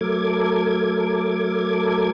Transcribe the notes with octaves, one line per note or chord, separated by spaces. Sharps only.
F#3 A3 A4 A#4 D6 G#6